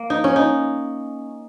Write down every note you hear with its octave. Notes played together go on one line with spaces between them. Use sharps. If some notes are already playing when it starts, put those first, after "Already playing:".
Already playing: A#3
D#4
C#4
D#4